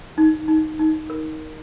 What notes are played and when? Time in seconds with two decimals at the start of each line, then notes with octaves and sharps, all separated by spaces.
0.18 D#4
0.48 D#4
0.79 D#4
1.10 A#4